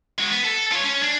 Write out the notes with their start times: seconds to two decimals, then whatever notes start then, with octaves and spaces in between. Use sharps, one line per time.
0.18 G#3 F#4
0.32 B3
0.44 A4
0.72 F4 C#5
0.84 C#4
1.02 D4